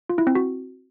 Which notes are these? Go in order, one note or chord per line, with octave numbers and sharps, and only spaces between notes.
F4
E4
C4
F#4